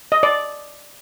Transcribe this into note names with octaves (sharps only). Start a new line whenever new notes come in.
D#5
D5